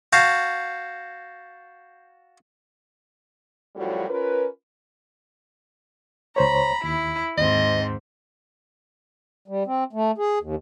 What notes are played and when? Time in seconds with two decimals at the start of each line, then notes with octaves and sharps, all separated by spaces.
0.13 F#4 F5 A5 G6 C7
3.76 F#2 A2 F3 G3 C#4 F#4
4.09 C#4 F4 A#4 B4
6.36 C#2 C5 C#5 A#5 B5
6.84 D#2 E4
7.38 D#2 G#2 C4 D#5
9.48 G3
9.66 C4
9.93 A3
10.18 G#4
10.41 D#2